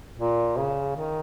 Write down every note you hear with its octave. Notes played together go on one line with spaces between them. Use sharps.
A#2
C#3
D#3